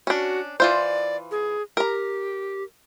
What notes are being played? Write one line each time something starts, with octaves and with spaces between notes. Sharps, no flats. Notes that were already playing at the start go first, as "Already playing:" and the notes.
C#4 D4 F#4
E3 F4 C5 D5
G#4
G4 A#4 A#5